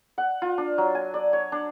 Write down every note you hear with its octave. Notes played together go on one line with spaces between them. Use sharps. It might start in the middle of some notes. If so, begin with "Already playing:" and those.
F#5
F4
D4
F#3
G#5
D5
C#5
D4